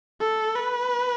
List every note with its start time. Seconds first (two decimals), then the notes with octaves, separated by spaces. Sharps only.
0.20 A4
0.55 B4